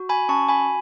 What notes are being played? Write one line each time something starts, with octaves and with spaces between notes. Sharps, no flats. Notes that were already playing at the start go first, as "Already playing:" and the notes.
Already playing: F#4
G#5 B5
C#4 A5 C#6
G#5 B5